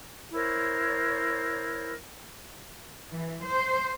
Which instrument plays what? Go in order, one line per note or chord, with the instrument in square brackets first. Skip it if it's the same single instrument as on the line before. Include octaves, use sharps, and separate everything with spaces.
[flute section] E4 A#4 C5 C#5
[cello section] E3
C5